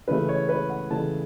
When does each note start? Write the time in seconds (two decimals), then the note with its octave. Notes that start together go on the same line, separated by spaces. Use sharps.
0.08 C#3 E3 A3 B4
0.29 C#5
0.49 B4
0.70 F#5
0.90 C#3 E3 A3 A5